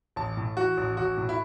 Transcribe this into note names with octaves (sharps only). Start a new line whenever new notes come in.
A1 A5
A2
E3 F#4
A1
A1 F#4
A2
E4